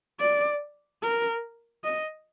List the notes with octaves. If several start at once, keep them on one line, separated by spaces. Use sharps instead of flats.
D5
A#4
D#5